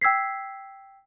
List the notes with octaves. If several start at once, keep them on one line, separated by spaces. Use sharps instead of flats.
G5 E6 G#6 B6 C7